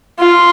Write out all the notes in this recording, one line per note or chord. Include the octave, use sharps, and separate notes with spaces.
F4